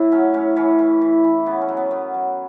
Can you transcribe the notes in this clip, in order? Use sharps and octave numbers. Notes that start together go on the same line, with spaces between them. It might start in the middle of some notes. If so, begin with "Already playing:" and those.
Already playing: A2 E4
F#3 C#4
A2 C#4
E3 C#4
E3
E3
E3
C#3 B3
C#4
F#3
B3
F#2 B3
F#3